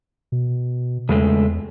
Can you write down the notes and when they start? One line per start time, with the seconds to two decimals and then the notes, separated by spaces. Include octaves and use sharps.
0.32 B2
1.09 E2 C#3 G#3 A3